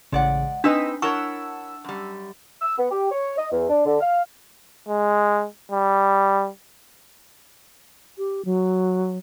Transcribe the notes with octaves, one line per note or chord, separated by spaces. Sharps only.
A1 C#3 G#3 D5 F#5
C4 D4 D#4 B4 D#5 E6 B6
E4 A#4 C#5 F#5 A5 C#6 E6
F#2 G3
E6
B3
G4
C#5
D#5
E2
D4
D3
F5
G#3
G3
G4
F#3